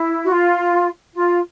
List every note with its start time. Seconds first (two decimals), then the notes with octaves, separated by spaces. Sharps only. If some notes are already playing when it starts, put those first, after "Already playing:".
Already playing: E4
0.24 F#4
0.28 F4
1.14 F4